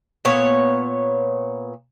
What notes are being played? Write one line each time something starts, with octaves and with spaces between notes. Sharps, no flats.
A#2 B3 C#5